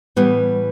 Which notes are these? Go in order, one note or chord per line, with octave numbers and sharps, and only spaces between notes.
A2 E3 G3 B3